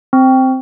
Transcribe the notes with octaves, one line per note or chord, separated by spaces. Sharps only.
C4